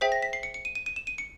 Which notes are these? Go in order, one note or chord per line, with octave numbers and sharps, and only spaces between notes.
G#4 C5 E5 G5 B6
A#6
B6
C7
C#7
C#7
D#7
D#7
D#7
E7
D#7
C#7